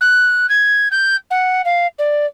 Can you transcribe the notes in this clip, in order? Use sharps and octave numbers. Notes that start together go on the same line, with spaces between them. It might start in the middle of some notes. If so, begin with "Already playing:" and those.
F#6
G#6
G6
F#5
F5
D5